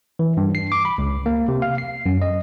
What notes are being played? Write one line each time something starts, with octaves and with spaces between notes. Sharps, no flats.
E3
G2
C7
D6
B5
C#2
A#3
C3
F5
C7
F#2
D#5